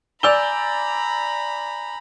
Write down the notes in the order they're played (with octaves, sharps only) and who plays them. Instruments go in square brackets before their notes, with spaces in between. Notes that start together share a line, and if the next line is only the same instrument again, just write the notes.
[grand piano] D5 E6 G7 [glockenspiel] G#5 G6 F7 [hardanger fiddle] A#5 B5